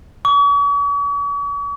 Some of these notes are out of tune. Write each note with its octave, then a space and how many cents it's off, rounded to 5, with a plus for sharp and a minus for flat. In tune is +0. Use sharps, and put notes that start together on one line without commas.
C#6 +45